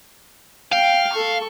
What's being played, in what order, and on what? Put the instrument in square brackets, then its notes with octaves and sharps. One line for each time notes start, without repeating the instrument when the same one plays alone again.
[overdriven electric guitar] F5 [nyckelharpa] G5
[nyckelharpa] A4 C#6